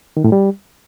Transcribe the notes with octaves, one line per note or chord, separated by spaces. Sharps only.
D#3
A2
G3